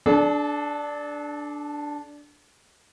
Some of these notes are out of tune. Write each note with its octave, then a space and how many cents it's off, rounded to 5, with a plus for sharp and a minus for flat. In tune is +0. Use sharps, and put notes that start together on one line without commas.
D4 +0 A4 -45